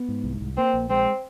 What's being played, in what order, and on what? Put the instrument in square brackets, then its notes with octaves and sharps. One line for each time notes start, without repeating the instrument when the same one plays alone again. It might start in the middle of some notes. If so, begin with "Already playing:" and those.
Already playing: [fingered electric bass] B3
G#2
C2
C2
[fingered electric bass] A#3 [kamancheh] C4
[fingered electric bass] A#1
[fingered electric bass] G#3 [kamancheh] C4